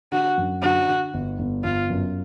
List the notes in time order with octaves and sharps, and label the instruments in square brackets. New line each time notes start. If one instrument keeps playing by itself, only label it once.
[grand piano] D3 [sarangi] F#4
[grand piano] F#2
[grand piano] D3 [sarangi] F#4
[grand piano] D3
G1
G1
[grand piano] G1 [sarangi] F4
[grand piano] F#2